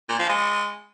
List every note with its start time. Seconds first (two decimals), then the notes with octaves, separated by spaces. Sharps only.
0.09 A#2
0.19 F3
0.29 G#3